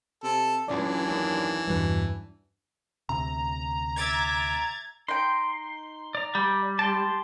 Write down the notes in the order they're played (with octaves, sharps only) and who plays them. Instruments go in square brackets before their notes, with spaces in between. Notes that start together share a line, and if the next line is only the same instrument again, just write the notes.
[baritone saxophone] C3 [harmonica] A4
[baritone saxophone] C#2 [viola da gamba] F#2 D4 [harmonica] E3 [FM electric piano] D5
[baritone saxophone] D#2
[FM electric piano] E2 G2 [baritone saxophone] B2
[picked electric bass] D2 C3 [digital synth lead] A#5
[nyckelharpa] E5 D6 [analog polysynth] G#6 A6
[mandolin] D#4 G5 [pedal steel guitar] C6
[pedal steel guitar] D5 A#5
[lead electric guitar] G3
[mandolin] G4 [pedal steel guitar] A5 C6